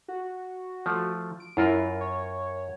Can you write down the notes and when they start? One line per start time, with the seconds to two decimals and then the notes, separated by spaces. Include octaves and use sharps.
0.08 F#4
0.86 F3 A3
1.40 D7
1.57 F#2 E4 F4 A#4
2.01 C#5